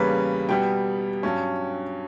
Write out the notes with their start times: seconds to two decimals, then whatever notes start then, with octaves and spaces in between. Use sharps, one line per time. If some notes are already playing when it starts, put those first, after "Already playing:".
Already playing: E2 C#3 G3 A#3 C#4 B4
0.49 B2 G3 B3 G5
1.23 G2 F#3 C#4